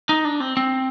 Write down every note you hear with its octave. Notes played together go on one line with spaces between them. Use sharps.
D#4
D4
C4
C4